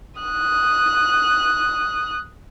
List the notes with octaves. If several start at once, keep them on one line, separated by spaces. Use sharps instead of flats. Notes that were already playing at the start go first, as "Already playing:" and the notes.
D#6 F#6